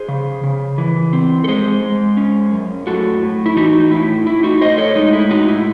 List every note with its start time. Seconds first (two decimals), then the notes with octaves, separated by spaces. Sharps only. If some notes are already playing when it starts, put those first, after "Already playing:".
Already playing: G#4 C5
0.08 C#3
0.44 C#3
0.78 E3
1.13 C4
1.44 A4
1.48 G#3 G#4 C5
1.82 G#3
2.17 C#4
2.52 F#2
2.87 A2 F#4 A4
3.22 A2
3.46 E4
3.56 E3 D#4 F#4
3.80 D#4
3.91 A2 E4
4.27 A2 E4
4.43 D#4 F#4
4.61 A2 C5 D#5
4.78 A4 C#5
4.95 G#3 D#4
5.13 E4
5.30 A2 D#4 F#4
5.48 E4